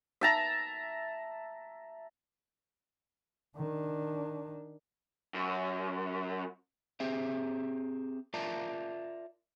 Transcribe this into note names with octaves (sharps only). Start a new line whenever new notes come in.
E5 A5 A#5
D#3 D4
F#2
C4 G4 G#4 E5
F4 A#4 D5 E5 A5 A#5